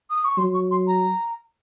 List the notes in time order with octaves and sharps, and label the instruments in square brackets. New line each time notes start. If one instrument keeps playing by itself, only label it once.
[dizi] D#6
C#6
[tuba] F#3 [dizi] C6
[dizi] C#6
C6
A#5